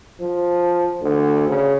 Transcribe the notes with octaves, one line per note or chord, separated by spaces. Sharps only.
F3
D2
C#3